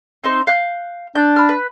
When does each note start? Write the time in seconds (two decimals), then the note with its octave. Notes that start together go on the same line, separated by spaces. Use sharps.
0.24 C4 D#4 C5
0.47 F5 F#6 G6
1.15 D4 G6
1.36 B5 F6
1.49 B4